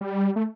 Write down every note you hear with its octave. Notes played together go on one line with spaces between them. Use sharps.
G3
A3